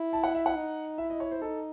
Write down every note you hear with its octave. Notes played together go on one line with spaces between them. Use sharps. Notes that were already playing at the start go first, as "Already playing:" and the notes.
Already playing: E4
A5
F#5
E5
F#5
D#4
E4 E5
D#5
C#5
C5
D#4 A4